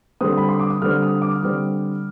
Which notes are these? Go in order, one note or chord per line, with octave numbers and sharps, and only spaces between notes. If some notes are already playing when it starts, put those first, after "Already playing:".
D3 G3 C4 D#6
B5
C6
D6
D#6
D3 G3 C4 F6
D#6
D6
D3 G3 C4 F6